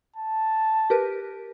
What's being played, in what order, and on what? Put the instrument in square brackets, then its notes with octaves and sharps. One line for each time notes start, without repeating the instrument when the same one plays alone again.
[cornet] A5
[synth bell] G4 A#4 B4